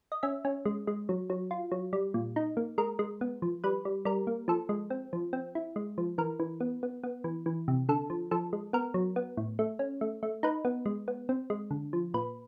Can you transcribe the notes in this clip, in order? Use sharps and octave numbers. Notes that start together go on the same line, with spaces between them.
D#5
C#4 E5
C#4
G#3
G#3
F#3
F#3
F4
F#3
G3
A#2
D#4
A#3
G#3 A#4
G#3
B3
F3
G3 B4
G3
G3 A#4
A#3
F3 A4
G#3
C4
F3
C4
E4
G#3
F3
E3 A#4
E3
B3
B3
B3
E3
E3
C3
D3 A4
F3
F3 A4
G#3
B3 A#4
F#3
B3
A2
A3
C#4
A3
A3
D#4 B4
B3
G#3
B3
C4
G#3
D3
F3
A#2 B4